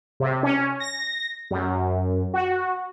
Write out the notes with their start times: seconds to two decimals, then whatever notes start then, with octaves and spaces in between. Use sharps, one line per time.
0.20 C3
0.43 C#4
0.80 A#6
1.51 F#2
2.34 F#4